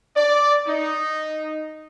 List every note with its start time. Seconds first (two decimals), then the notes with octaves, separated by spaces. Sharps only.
0.16 D5
0.67 D#4